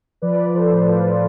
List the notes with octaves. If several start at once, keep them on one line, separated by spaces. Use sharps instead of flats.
F3 B4 D5
F3
F3 A4 C5
A2
A2 F4
F3